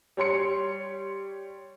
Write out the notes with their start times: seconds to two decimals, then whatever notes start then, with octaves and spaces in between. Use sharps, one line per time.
0.17 G3 C#5 C6 C#7